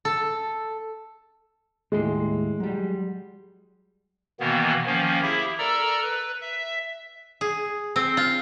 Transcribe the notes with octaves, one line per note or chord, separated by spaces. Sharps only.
A4
D#2 A2 G#3 C6
F#3 G3
B2 D#3 E3 A#3 B3
D#3 F3 A#3 C#4
E4 G4 G#4 E5
A4 A#4 D5 A#5 E6
B4
E5
G#4
C4
F4